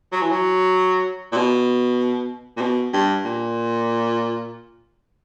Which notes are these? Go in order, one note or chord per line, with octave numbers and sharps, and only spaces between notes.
F#3
E3
F#3
A#2
B2
A#2
B2
G2
A#2